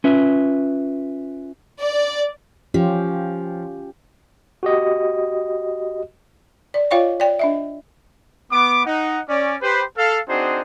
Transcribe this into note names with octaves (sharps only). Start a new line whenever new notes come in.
C#4 F4 B4 E5
D5
F3 C#4 F4 G4
F#4 G4 D#5
D5
F4 C#5 D#5 F5 G5 C#6
D5 G5
D4 D#5 E5
B3 D6
D#4 F#5
C#4 D5
G4 B4 C5
A4 F5
C4 D4 D#4 F#4 G#4 C5